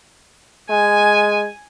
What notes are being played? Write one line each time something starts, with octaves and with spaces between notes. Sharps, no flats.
G#3 G#5